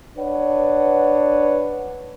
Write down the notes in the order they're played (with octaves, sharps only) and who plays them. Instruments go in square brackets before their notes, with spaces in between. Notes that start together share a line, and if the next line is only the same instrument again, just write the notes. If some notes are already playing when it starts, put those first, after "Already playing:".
[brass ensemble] D4 B4 C#5 F#5